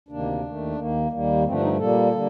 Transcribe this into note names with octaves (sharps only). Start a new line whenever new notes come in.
D2 C3 D#3 A#3 D4
D#2 D#3 A3
D#2 D#3 A#3
D#2 D#3 G3 A#3
G2 D3 F3 A3 C4
D4
D#4
A#2 G3 A#3 A4
D3 G3 A#3